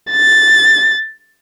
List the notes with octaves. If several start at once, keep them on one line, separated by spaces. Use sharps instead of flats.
A6